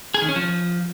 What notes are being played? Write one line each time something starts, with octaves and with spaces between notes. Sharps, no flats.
G#4
D#3
C#4
F3